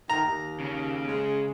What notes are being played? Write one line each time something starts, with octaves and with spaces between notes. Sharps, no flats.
D#3 A#5
D#2
C#3 C#4
G#3